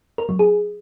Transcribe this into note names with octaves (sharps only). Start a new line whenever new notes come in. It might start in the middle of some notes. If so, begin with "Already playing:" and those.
A#4
F#3
G#4